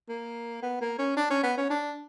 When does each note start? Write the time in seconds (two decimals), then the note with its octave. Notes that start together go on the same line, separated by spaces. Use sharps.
0.09 A#3
0.62 B3
0.81 A#3
0.99 C#4
1.17 D4
1.30 C#4
1.43 B3
1.57 C#4
1.70 D4